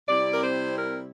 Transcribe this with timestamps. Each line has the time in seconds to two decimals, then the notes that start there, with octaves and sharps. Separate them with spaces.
0.08 C3 G3 C4 E4 D5
0.33 A#4
0.43 C5
0.78 A#4